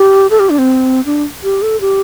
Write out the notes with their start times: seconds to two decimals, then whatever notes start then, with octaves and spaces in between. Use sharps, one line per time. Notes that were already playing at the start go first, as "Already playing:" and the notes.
Already playing: G4
0.31 A4
0.40 G4
0.50 D4
0.58 C4
1.06 D4
1.43 G4
1.62 A4
1.81 G4